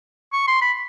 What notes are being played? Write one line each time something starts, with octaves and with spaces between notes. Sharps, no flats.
C#6
C6
B5